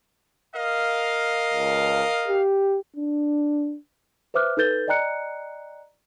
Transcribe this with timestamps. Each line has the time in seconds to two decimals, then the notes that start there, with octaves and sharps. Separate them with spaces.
0.55 A#4 D#5 F5
1.54 C#2
2.28 G4
2.96 D4
4.34 B4 C5 E5 D6 F6 F#6
4.57 D#4 A4 B4 G6 A6 G7
4.88 D5 D#5 G5 A#5 F#6 C#7